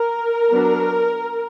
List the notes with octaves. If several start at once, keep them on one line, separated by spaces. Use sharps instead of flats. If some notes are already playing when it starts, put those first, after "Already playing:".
Already playing: A#4
F#3 B3 D4